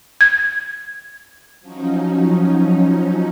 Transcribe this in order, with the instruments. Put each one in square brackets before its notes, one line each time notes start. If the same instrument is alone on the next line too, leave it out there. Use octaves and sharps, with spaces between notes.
[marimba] G#6
[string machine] F3 F#3 C#4 D#4